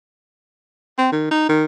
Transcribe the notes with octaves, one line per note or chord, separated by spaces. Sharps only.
C4
D#3
D#4
D#3